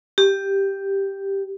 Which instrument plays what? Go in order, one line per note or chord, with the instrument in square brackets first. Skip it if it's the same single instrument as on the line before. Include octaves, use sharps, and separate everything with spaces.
[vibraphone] G4